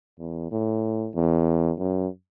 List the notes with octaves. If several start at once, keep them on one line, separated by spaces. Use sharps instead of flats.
E2
A2
E2
F#2